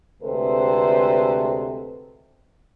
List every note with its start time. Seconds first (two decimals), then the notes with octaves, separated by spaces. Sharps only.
0.22 D2 C3 G#3 A4 B4 C5